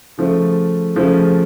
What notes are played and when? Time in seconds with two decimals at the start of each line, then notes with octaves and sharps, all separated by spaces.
0.17 C#3 F3 A3
0.96 C#3 F3 A3